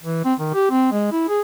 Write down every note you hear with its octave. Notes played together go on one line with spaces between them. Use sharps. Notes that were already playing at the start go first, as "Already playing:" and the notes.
E3
C4
D#3
G4
C4
G#3
E4
G#4